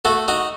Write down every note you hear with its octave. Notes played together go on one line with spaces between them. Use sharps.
A3 F#4 A4
D#4 F#4